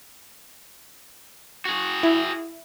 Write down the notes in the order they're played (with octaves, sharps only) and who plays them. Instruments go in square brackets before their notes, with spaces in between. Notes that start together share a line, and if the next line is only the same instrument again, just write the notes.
[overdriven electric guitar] F#4 G#4
[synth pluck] E4